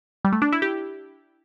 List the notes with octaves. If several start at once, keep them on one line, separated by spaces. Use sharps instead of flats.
G3
A3
D4
E4
G4